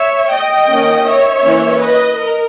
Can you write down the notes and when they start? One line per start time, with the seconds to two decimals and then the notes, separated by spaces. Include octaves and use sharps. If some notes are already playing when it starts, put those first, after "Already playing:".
Already playing: C#5 E5
0.29 D#5 G5
0.67 D#3 A#3 C#4
1.04 C#5 E5
1.43 E3 A#3 C#4
1.80 B4 D#5
2.18 A#4